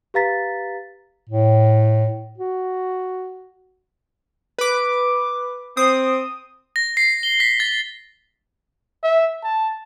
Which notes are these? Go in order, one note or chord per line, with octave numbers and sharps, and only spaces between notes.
G4 B4 F5 A#5 A6 B6
A2
F#4
B4 D6
C4 D#6
A#6
C7
G7
B6
A6
E5
A5